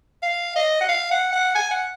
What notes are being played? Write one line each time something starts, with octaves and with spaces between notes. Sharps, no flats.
F5
D#5
F#5
F5
F#5
F#5
G#5
F#5